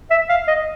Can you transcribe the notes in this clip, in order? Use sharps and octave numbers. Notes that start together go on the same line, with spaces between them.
E5
F5
D#5